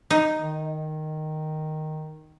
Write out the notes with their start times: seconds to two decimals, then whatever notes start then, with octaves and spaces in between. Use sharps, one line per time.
0.10 D#4
0.38 D#3